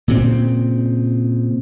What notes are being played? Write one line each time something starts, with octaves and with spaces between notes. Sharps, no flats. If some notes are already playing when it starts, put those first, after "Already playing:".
A#2 C#3 C4